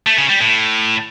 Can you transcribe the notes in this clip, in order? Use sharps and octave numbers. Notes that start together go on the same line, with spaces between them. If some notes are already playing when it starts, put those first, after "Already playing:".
A3
C#3
G3
A2